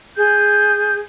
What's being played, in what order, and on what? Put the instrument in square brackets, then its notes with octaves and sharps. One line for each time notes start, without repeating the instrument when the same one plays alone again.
[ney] G#4 [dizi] G6